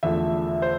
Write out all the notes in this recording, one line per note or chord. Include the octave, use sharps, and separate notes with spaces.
E1 E2 D3 F3 A3 E5
C5